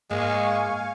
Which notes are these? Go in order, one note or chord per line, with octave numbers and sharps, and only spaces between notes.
G#2 G#3 A#3 F5 G#5 C#6